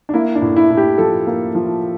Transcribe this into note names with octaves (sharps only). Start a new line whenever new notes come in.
D4
A#3 E4
D4
A2
E4
A2
G4
F3 A4
A#3
F3